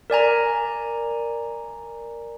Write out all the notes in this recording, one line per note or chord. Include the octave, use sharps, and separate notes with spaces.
A#4 D5 G#5 A#5